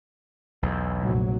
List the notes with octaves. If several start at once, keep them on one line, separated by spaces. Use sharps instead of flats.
B1 E2
F1 A#1 F#3